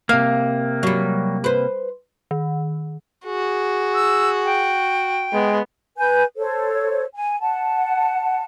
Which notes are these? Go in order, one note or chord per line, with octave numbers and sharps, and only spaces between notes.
C3 A#3 F5
F#3 G3
B4 C5
D#3
F#4 G#4
E6
G5
G#3 B3
B4 G#5 G6
A4 C5 C#5
G#5
F#5 A5